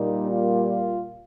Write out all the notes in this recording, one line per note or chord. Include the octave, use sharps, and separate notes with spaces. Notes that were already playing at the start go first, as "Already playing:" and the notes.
Already playing: A#2 G3 A#3 D#4
F4
F4